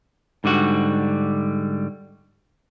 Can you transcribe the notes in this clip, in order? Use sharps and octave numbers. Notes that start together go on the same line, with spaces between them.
G#2 D3 G3 F#4